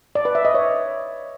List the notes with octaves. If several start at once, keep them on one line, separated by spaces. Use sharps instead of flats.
D5
B4
E5
D#5
C#5